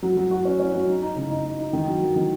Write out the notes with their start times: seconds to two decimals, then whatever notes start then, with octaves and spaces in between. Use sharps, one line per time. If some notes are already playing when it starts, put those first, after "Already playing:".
0.03 F#3
0.17 F#3
0.31 F#4
0.45 C#4
0.59 C#4
0.74 F#3
0.88 D#4
1.02 D#4
1.16 C#3
1.30 D#4
1.45 D#4
1.59 D#4
1.73 D#3
1.88 F#3
2.02 F#3
2.16 D#3